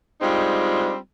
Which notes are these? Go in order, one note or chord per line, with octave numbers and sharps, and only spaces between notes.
G3 G#3 C4 D4 D#4 F4